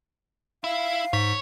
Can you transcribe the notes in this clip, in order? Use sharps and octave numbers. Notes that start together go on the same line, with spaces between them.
E4 F5
G#2 C#5 B6